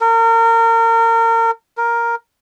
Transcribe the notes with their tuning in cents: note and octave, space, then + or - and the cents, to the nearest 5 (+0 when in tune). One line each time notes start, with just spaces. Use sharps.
A#4 -30
A#4 +5